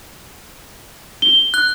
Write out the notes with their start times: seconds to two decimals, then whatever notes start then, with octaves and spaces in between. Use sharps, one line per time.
1.22 G7
1.54 F#6